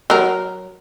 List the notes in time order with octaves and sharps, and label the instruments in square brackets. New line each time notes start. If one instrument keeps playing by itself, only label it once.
[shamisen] F#3 A#4